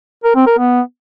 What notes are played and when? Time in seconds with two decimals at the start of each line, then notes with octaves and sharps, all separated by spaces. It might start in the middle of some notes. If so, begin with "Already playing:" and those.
0.24 A#4
0.35 C4
0.47 A#4
0.58 B3